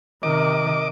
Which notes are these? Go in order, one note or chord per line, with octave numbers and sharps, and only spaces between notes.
C3 D#3 D#5 D6